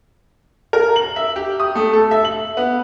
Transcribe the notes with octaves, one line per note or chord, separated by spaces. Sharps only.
A#4
F#7
E5
G4
D#6
A3
A4
E5
F#7
B3